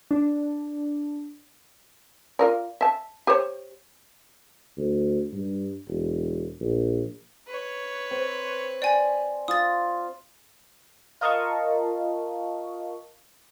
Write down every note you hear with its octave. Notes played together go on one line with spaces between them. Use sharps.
D4
F4 A#4 D5
E5 A5
G4 C5 C#5
D2
G2
E1
A#1
B4 C#5
C4
D5 G5 G#5
F4 D#6 A6
F4 A#4 D#5 F5 A5 C#6